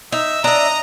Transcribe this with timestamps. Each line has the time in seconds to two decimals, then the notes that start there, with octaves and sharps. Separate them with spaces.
0.12 D#4 E5
0.44 D4 D#5 E5 A#5